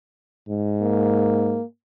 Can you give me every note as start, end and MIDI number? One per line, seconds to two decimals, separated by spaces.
0.48 1.58 44
0.82 1.63 58